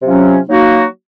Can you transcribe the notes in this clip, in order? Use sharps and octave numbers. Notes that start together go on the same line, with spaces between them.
C3 F#3 C#4 F4
F#3 A#3 D#4 F#4